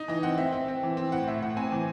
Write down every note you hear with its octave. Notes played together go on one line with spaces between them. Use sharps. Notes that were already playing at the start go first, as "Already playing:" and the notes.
Already playing: D#4
E3 D#5
C4 F#5
C4 E5
C4
C4
E3
C4
A2 F#5
A2 E5
A2 F#5
C4 G#5
E3